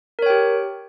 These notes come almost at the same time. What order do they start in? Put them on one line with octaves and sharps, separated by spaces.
A#4 C#5 G5 G4